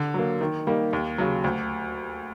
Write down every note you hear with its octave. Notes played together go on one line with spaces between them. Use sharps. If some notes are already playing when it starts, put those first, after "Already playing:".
Already playing: D3
F#3 A#3
D#3
G3 A#3 D#4
D#2
C#3 F#3
D2